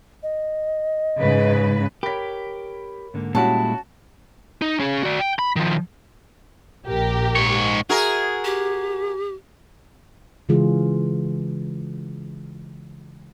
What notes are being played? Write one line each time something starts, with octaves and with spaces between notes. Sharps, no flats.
D#5
G#2 C#3 B4
G4 A#4 C#5 B5 B6
G#2 D3 A#3
A#2 G3 G#3 C#4 E4 F#4 A5
D#4
C#4 G#4
F#4 D5
G5
B5
D#3 F3
A#1 G4 A#4
G#2 C#5
F#4 G#4 A#4 E5
G4
C#3 E3 G#3 F4 G#4